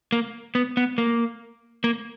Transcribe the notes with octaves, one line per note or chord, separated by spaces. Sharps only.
A#3
B3
B3
A#3
A#3